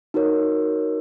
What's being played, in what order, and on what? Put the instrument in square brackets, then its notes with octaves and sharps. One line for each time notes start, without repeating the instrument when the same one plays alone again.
[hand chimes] D#4 F#4 A#4 C#5